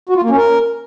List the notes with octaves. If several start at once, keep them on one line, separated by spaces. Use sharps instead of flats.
F#4
F4
A#3
C#4
A#4